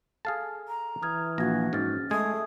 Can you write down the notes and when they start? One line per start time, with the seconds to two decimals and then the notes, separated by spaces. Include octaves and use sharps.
0.25 G#4 A4 F5 A5
0.68 A#5
1.03 E3 D#6 F6 G#6
1.38 A#1 F#4 G#6 A#6
1.73 G#2 C#4 F6 A6
2.11 G#3 A3 D#6 G#6